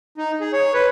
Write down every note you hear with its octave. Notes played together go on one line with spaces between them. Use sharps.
D#4
G#4
C#5
B4